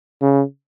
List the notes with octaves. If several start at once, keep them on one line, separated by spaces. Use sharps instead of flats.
C#3